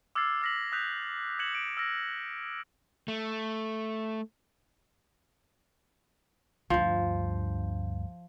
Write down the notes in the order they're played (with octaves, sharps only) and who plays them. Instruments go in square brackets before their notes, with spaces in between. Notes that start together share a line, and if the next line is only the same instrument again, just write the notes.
[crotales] D6 E6 F6 G#6 A6 C7
E6 F6 A#6 B6 F#7
D#6 E6 F#6 G6 B6 F7
F#6 G#6 C#7 E7 F#7
D7
E6 F6 A#6
[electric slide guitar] A3
[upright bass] D2 G2 [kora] F3